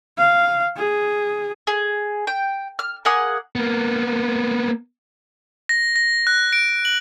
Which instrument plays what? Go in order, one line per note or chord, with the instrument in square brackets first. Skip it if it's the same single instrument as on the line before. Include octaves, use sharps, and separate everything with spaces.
[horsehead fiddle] F5
G#4
[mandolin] G#4
G5
F6
A#3 G#4 F#5 D#6
[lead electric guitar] A#3 B3
[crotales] A#6
A#6
F#6
D7
F#7